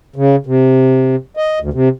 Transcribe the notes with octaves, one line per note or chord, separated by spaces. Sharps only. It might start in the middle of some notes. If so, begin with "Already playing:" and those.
C#3
C3
D#5
D2
C3